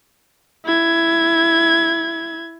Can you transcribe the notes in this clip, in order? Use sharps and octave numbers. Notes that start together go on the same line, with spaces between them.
E4 G#6